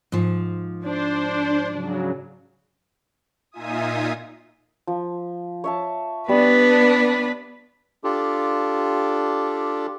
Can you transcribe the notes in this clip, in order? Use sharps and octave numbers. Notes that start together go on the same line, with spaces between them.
G#2 F3
D4 C5
C#3 F#3
A#2 D#4 F4 E5 G#5 D#6
F3
C#5 E5 A5
G3 B3 D4 B4
D4 F4 G4 A4